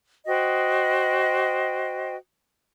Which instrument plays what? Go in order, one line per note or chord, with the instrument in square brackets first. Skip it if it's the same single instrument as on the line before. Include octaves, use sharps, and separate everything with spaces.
[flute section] F#4 C5 D#5 G5